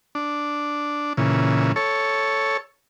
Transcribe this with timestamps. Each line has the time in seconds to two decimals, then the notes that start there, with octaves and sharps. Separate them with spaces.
0.15 D4
1.17 A#2 C#3 E3
1.76 A4 C#5